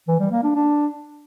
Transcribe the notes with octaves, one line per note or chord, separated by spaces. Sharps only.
E3
G3
A#3
D4
D4